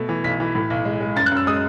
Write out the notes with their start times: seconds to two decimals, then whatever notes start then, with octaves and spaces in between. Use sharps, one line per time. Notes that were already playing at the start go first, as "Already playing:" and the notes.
Already playing: B2 A3
0.09 E3
0.24 B1 B6
0.40 E3
0.55 A2
0.70 B1
0.85 G#3
1.01 G#3
1.16 F#2 A6
1.26 F#6
1.31 F#2
1.37 E6
1.47 G#3 D#6